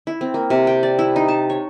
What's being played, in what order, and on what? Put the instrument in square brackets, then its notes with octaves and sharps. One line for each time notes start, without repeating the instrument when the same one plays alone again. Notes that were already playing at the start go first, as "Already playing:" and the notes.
[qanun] E4
C4
A#3
C3
G5
D5
E4
D#4
A5
C#5